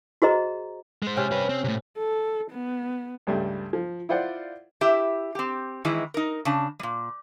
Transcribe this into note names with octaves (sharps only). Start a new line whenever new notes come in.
F#4 G#4 C5 D#5 A#5
G#3 C5
C3 C#4 G5
G3 B4
C4
A2 C3
A4
B3
C#2 G2 G3 A3
F3
E4 F4 C5 D5 F#5
E4 G4 E5
C4 G4
D#3 E3 G#3 E4
D#4 A#4
C#3 D4 A5
A#2 G3